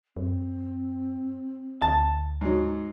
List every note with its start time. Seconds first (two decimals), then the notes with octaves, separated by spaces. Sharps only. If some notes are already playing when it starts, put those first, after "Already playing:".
0.17 F#2 C4
1.82 D2 A5
2.41 G#2 F#3